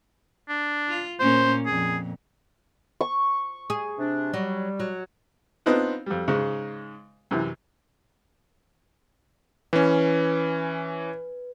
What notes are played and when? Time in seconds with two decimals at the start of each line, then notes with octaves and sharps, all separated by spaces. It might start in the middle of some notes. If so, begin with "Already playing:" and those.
0.49 D4
0.89 F4
1.20 A#2 A#3 C#4 C5
1.66 F2 A#2 G#4
3.01 C#6
3.70 G#4
3.98 C3 D4
4.34 F#3 G3
4.80 F#3
5.66 B3 C4 D4 D#4 F4 B4
6.06 F2 G3
6.28 G#2 C#3 G#3
7.31 F#2 C3 E3
9.73 E3 C#4 B4